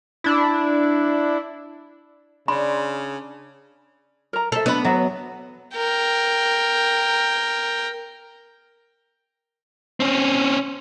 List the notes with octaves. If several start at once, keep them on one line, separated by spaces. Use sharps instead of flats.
D4 E4
C#3 D4 B5 C6
A#4 A#5
A4 C5 E5
B3 D4 D#5 B5
F#3 E5
A#4 G5
C4 C#4